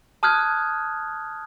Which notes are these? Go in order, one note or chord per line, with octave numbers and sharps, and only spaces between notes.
A5 D#6 F6 F#6 G#6